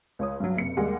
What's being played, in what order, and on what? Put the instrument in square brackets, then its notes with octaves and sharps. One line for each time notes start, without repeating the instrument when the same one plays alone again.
[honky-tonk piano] C#2 C#5 D#6
G2 F#3
F#1 C3 C#7
D#2 G3 G#3 F#5